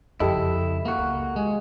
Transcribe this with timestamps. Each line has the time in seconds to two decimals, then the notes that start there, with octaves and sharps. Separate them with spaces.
0.20 F2 C#3 E4 G4 A4 D#5
0.85 A#3 F#4
0.98 C#2
1.36 G#3